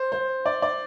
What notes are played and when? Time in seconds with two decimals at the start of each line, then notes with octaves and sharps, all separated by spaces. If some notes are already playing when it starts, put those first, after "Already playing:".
Already playing: C5
0.12 C5
0.46 D5
0.62 D5